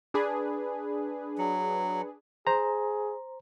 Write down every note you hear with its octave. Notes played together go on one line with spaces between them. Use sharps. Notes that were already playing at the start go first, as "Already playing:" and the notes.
D4 G#4 B4
F#3
G#4 C5 A#5